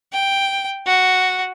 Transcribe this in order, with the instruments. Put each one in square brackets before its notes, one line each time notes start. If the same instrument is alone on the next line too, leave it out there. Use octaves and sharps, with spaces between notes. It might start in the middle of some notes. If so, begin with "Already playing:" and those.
[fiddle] G5
F#4